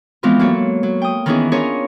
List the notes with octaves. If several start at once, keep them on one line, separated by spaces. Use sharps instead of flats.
E3 F3 G#3 B3 C4 F4
F#3 A#3 A4 C#5
F#3
G5 D#6
D#3 E3 B3 C#4 E4 G#4
C#4 D4 F4 G#4 A#4 C#5